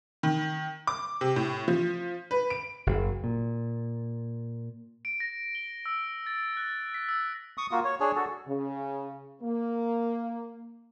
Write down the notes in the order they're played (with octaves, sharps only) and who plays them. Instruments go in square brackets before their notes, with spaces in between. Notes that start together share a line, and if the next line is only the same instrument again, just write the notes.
[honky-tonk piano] D#3
D6
C3
A2
F3
B4
D7
[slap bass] F#1
A#2
[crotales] D7
A#6
G7
E6
A6
F#6
B6
E6
[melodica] C#6 D#6
A#3 F4 F#4
C#5
D4 G#4 C#5
F#4 A4
[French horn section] C#3
A#3